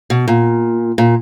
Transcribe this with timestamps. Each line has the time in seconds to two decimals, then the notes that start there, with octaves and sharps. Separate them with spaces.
0.10 B2
0.28 A#2
0.98 A#2